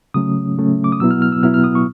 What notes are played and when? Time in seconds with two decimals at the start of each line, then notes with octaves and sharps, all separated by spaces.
0.14 C#3 F#3 A3 C#4 D#6
0.57 C#3 F#3 A3 C#4
0.84 D6
0.92 D#6
1.00 B2 F#3 B3 E4 E6
1.11 F6
1.22 F6
1.32 E6
1.43 B2 F#3 B3 E4 F6
1.54 F6
1.64 D#6
1.75 C#6